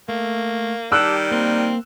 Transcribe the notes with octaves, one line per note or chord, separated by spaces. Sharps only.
A3 A#3
D#3 G3 G4 A5 D6 E6 F#6
A#3 C4